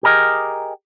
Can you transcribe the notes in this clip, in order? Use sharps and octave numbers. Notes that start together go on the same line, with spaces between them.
G4 G#4 A#4 D#5